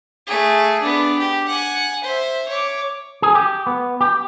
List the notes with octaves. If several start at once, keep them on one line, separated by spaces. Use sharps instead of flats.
A3 G#4
B3 D4
G4
F#5 G#5
C5 E5
C#5 D6
G#4
G4
B3
G4